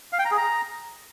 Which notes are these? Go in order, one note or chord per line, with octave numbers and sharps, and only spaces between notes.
F5
G5
A#5
G#4
A#5